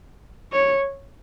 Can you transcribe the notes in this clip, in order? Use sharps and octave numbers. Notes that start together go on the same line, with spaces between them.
C#5